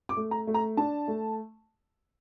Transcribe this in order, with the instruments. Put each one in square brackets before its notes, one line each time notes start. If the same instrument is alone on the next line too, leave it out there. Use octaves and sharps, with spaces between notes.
[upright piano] D6
A3
A#5
A3
A#5
D4 A5
A3